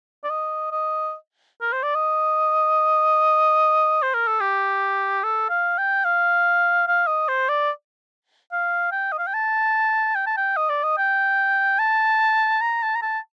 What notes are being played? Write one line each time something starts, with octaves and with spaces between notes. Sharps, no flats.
D5
D#5
D#5
A#4
C5
D5
D#5
C5
A#4
A4
G4
A4
F5
G5
F5
F5
D#5
C5
D5
F5
G5
D#5
F5
G5
A5
G5
A5
G5
D#5
D5
D#5
G5
A5
A#5
A5
A#5
A5